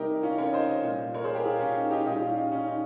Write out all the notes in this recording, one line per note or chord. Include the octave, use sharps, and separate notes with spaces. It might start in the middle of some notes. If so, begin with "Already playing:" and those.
Already playing: C3 G3 D#4 G4 A#4
C#4 F4
A#4 C#5
C5 D#5
A#2 G3
A#4 C#5
G#4 C5
G4 A#4
F4 G#4
C#4
D#4
D#4 G4
A#2 G3 D#4 G4
C#4 F4
D#4
C#4
D#4